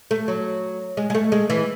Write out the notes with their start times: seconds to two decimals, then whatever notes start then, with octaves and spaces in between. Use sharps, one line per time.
0.11 A3
0.28 F#3
0.97 G#3
1.10 G#3
1.15 A3
1.32 G#3
1.50 E3